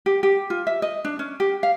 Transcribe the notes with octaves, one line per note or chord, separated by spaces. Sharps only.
G4
G4
F4
E5
D#5
D4
C#4
G4
F5